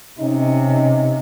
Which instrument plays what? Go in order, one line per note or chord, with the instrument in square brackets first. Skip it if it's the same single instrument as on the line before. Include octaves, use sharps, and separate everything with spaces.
[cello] C3 [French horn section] C#4 D#4 D#5